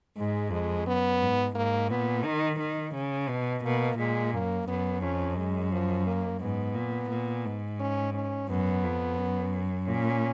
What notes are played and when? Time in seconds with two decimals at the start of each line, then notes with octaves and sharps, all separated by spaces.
0.17 G#2 G#3
0.51 F2 G#3
0.85 F#2 B3
1.21 G#2
1.55 G#2 A#3
1.90 A#2 B3
2.24 D#3
2.59 D#3
2.94 C#3
3.29 B2
3.64 B2 A#3
3.98 A#2 G#3
4.33 F#2 A#3
4.67 F#2 B3
5.02 F2 C#4
5.37 F#2 G#3
5.72 F3
6.06 A#3
6.41 G#2 B3
6.75 A#2
7.10 A#2
7.45 G#2
7.80 C#4
8.14 C#4
8.49 F#2 B3
8.84 F2
9.18 F#2
9.88 A#2 C#4